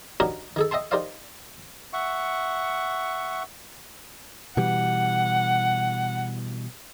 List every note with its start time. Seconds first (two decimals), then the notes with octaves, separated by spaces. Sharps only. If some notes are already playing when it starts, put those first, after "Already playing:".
0.20 D4 D#4 F#4 G4 A#4 C#5
0.56 D#3 G#4 A4
0.71 D#5 E5 G5 A5 C6
0.91 D#4 G4 A#4 C5 D5 F5
1.93 E5 F#5 C#6
4.57 B2 E3 G3 F#5